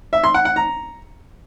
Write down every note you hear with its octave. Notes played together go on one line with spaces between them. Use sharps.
E5
C6
F#5
F#5
A#5